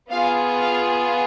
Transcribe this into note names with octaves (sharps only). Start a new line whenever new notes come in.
B3 F4 G#4 F5
F5